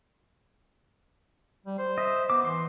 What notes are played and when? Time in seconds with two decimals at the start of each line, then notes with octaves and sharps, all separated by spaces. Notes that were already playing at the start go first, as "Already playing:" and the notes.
1.66 G3
1.78 C5
1.98 D#5 E5
2.30 B3 D6
2.45 E3 C6